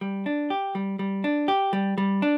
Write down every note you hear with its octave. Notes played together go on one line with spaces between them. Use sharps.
G3
D4
G4
G3
G3
D4
G4
G3
G3
D4